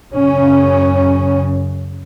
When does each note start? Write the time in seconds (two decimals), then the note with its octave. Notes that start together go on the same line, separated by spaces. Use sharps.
0.13 F#2 C#3 C#4